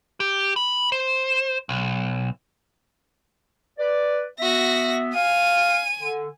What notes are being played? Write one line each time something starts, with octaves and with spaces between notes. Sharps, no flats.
G4
B5
C5
B1
B4 D5
B3 F#4 E5 A#6
F5 G#5 D#7
D3